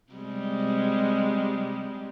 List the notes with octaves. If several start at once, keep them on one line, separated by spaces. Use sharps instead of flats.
C3 G3 G#3